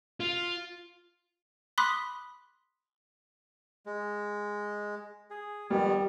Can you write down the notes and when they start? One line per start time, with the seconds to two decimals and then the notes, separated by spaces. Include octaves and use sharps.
0.20 F4
1.78 B5 C6 D6 D#6 F#6 B6
3.86 G#3
5.30 G#4
5.70 F2 D#3 G3 B3